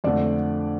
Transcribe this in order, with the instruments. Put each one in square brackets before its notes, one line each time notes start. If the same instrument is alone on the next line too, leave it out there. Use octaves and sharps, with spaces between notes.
[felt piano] F2 D3 A3 D5